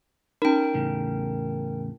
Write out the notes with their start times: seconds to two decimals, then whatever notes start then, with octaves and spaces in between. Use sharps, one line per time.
0.42 C#4 D#4 A#4 G5
0.74 E2 A2 C#3